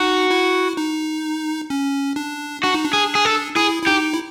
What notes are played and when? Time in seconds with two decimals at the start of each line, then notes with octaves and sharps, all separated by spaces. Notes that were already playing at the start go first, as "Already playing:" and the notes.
Already playing: D#4 F#4
0.31 E4
0.77 D#4
1.70 C#4
2.16 D4
2.63 D4 F#4
2.74 D#4
2.84 D4
2.93 G#4
3.15 G#4
3.25 A4
3.56 E4 G#4
3.83 E4
3.87 D#4 G4
4.14 E4